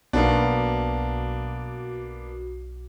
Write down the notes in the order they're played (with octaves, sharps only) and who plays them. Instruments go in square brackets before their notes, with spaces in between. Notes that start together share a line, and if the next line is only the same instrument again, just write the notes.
[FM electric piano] B1 F#4 [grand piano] A#3 B3 D4